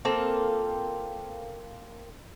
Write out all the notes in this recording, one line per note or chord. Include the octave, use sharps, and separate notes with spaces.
A#3 C4 F4 A4